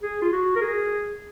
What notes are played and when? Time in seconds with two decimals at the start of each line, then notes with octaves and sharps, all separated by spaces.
0.03 G#4
0.22 F4
0.32 F#4
0.56 A#4
0.61 G#4